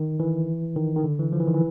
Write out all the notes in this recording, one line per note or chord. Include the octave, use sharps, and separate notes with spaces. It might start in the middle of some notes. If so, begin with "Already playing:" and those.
Already playing: D#3
E3
D#3
D#3
D3
E3
F3
E3
D#3
E3